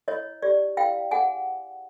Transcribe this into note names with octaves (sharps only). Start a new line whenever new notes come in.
E4 C#5 D#5
G4 D5
E4 F5 G5
G#4 F#5 G#5